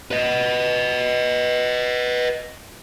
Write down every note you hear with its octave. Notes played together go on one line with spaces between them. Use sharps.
B4 D#5